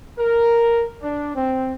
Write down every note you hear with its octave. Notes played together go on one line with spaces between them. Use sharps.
A#4
D4
C4